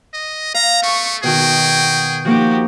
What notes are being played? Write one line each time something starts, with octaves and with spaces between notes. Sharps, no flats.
D#5
F5 A#5
A3 C#6
B2 D#3 F#4 G#4 G5
F3 A#3 D#4 F#4 G4